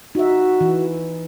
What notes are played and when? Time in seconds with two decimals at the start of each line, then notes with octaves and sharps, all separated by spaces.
0.15 D#4 F#4 E5
0.61 E3